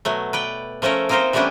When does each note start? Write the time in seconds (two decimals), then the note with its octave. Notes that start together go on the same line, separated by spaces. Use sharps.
0.05 B2 F#3 A3
0.33 B4 D5 G5
0.82 F3 A3 C#4 A4 A#4
1.09 A#3 C4 D#4 F4 A#4 C5
1.33 E3 G3 A3 B3 C#4 D4